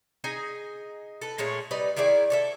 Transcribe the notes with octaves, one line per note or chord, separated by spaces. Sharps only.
D#4 G#4 D#5 G#5
A4 B4
A#2 G#3 A3 C#5
G3 D#4 B4 D5
D#3 E4 G#4 D5
A4 C#5 E5